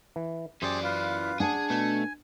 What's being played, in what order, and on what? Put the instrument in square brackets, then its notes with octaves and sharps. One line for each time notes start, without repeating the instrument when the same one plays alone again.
[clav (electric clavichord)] E3
[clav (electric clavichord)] F#2 [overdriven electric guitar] E3 D5 [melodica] G4 G#4 C5
[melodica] F4 B4 F5
[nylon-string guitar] D4 F#5 [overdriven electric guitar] G#4 [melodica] G#5
[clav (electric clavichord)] B2 [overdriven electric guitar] A3